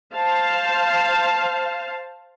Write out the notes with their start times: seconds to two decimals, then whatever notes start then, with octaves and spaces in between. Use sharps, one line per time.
0.14 C5 F5 A5